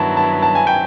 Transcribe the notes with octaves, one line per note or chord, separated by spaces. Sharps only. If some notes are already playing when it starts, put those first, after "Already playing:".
Already playing: G2 D#3 F#3 B3 E4 A5 A#5
A5
A5
G#5
G5